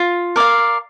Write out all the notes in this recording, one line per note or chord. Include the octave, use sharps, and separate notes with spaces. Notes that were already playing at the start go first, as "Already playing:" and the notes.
Already playing: F4
A#4 D5 F5